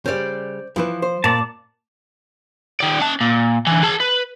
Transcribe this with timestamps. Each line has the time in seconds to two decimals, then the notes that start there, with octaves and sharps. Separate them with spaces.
0.06 C#3 G3 C5 D5
0.76 E3 F3 E4 B4
1.02 C5
1.24 A#2 D5 A5
2.80 D#3 D5
3.00 C#4 A5
3.21 A#2
3.67 D3 E3
3.83 G#4 A5
4.00 B4